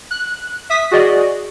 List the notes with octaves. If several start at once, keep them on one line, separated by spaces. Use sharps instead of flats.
F#6
E5 D#6 B6
F#4 G#4 D5 D#5